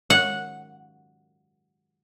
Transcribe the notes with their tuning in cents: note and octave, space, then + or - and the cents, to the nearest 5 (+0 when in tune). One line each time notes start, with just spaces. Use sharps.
F#5 -10